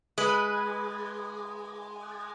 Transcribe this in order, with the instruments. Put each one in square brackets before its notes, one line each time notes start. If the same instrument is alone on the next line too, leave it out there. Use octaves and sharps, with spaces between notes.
[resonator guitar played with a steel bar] G#3 [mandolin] B4